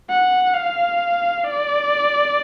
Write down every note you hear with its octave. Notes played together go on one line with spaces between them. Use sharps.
F#5
F5
D5